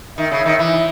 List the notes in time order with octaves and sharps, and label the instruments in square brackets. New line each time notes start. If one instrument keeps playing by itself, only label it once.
[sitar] D#3 [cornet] E5
[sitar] C#3
D#3
E3